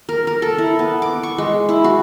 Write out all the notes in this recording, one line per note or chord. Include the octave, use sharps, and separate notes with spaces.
A#4
A#4
A4
E4
B3
D6
C#6
G#3
E4
F#4